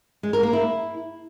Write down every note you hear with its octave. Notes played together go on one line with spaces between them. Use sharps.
G#3
A#4
A#3
E4